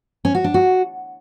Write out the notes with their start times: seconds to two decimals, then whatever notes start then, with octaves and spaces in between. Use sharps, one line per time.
0.25 C#4
0.35 F#4
0.44 D4
0.54 F#4